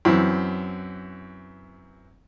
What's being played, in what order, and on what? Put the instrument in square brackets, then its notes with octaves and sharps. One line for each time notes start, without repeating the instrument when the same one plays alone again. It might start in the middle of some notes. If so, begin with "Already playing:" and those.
[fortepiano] F#2 E3 C4